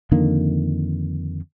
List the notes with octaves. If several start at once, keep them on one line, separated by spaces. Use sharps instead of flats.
F2 D3 D#3 A#3